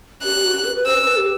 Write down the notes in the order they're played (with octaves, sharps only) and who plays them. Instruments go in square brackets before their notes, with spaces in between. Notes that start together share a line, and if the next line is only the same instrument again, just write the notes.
[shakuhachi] G4 [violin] F#6
[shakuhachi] G4
F#4
G4
B4
B4
[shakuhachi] C5 [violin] E6
[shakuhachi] B4
B4
G4